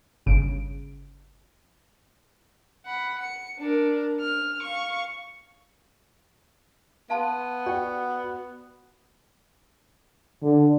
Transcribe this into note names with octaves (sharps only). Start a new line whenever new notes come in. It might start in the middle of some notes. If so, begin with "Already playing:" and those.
G1 C#3 D7
F#5 B5
C#7
D4 A#4
F6
F5 C#6
B3 F5 A5 C6
F#4 D5 G5
D3